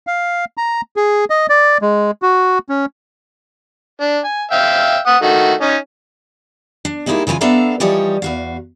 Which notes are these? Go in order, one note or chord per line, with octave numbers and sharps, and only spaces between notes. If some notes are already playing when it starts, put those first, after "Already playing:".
F5
A#5
G#4
D#5
D5
G#3
F#4
C#4
D4
G#5
E5 F5 G5
F#5 D#6
D#3 A3 F#4
C#4 D#4
D4
G3 G#3 A#3 D#4 E4 G#4
C#3 E3 A#3 F4 G#5
B3 D4 A4 E5 F5 A#5
E3 F3 G3 C#5 D#5
E2 F#4 F5